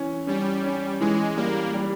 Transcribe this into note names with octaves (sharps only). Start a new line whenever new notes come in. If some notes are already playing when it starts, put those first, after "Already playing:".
Already playing: E3 C#4
G3 C#4
C#4
E3 G#3
G3 A#3
G3